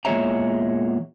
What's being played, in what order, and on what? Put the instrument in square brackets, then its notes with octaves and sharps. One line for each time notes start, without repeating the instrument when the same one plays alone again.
[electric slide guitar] E2 A#2 G#3 C#5 E5 A#5